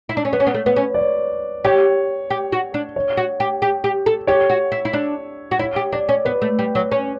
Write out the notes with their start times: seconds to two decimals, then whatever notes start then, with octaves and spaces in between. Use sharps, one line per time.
0.09 E4
0.17 D4
0.25 C#4
0.33 B3 C#5
0.40 C#4
0.47 B3
0.54 A3
0.66 B3 B4
0.76 C#4
0.94 D5
0.98 C#5
1.64 G4 C#5
2.30 G4
2.52 F#4
2.74 D4
2.96 C#5
3.17 F#4
3.40 G4
3.62 G4
3.84 G4
4.06 A4
4.27 G4 C#5
4.50 F#4
4.72 E4
4.85 E4
4.93 D4
5.51 F#4
5.59 E4 C#5
5.76 G4
5.93 D4 D5
6.09 C#4
6.25 B3 B4
6.42 A3
6.59 G3
6.75 F#3
6.92 C#4